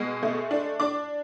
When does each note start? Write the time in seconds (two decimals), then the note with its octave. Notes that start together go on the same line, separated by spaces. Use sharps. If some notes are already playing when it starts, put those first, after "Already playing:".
Already playing: B2 G#3
0.23 A3
0.51 D4
0.80 D4 D6